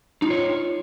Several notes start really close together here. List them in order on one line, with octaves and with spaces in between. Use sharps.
D#4 F4 C#5